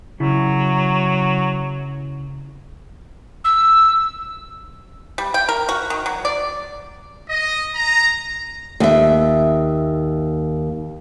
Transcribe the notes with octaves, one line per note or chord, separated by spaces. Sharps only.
C#3 F#3 E4
E6
G3
G5
A#4
F#4
D#3
F#3
D5
D#5
A#5
D#2 E5